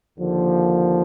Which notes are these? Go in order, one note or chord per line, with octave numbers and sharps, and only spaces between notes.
D#2 D3 F3 A#3